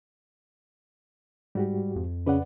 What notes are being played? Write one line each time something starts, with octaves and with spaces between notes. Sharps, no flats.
G#2 G3 F#4 G4
F2
C#3 B4 D5 F#5